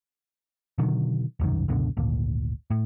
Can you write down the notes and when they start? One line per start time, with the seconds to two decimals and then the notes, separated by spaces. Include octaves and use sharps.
0.78 B2 D3 D#3 F#3
1.40 E1 C2 F#2 D#3
1.68 C#2 F#2 B2 D3
1.97 G#1 D2 A#2
2.70 A2